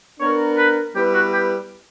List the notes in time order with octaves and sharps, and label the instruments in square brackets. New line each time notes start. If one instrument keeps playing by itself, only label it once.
[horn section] B3 D4 A#4 [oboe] C#5
[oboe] B4
[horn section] G3 B3 E4 B4 [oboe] G4
[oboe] F#4
G4